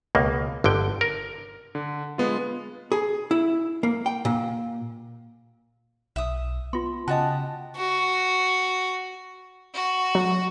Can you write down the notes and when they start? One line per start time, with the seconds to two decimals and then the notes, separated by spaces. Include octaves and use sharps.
0.15 C#2 B2 A#3
0.64 G1 D3 G5
1.01 A#4
1.75 D3
2.18 G#3 B3 F4
2.92 G#4
3.31 E4
3.83 A#3
4.06 G5
4.25 A#2
6.16 B1 E5 D#6
6.73 B3 F4 C6
7.08 C#3 F#4 G4 D#5 G#5 A5 D#6
7.77 F#4
9.74 F#4
10.15 F#3